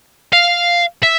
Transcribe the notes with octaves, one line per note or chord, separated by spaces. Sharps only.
F5
E5